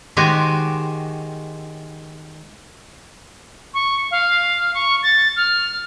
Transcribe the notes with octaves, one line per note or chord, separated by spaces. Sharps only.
D#3 G#3 F#4 G4 C5 G#5
C#6
F5
C#6
A6
F6